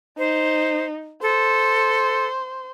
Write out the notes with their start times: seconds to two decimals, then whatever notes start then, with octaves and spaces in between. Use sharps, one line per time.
0.18 D#4 C5
1.22 A4 C5